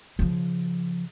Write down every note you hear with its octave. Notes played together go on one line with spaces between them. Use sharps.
C#3 F3